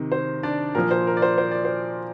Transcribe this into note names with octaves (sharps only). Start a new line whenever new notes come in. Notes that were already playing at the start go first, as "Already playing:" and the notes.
Already playing: C3 D#3
C5
D4 D5
A#2 F3 A#4
C5
A#4
D5
C5
C5
D5
C5